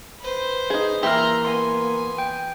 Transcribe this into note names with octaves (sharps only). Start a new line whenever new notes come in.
B4 C5
D#4 G#4
E3 A#3 G4 E5 A#5 C6 F6
B3 G#5 C6
G5